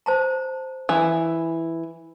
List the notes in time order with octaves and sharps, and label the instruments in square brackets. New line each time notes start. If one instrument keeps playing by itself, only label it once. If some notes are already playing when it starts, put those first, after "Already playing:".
[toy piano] C5 A5 A#5
[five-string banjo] E3